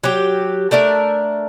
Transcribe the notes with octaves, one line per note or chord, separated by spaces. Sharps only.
F#3 G4
A3 D4 A#4 E5